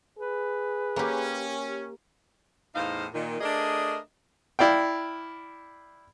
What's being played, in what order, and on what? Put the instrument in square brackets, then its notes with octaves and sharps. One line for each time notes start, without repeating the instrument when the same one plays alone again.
[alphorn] G#4 [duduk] B4
[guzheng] A#3 G4 [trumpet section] C#4
[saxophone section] E2 A2 D#4 C5 F5
A#2 D#3
A3 D4 G#4 A#4 D5 D#5
[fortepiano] E4 D5 F5 G5